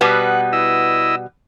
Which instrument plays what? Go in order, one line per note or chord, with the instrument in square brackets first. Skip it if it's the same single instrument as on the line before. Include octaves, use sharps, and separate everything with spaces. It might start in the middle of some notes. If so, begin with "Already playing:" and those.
[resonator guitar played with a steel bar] B2 G3 B3 [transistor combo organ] F#5
[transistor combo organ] E4 D#5 E6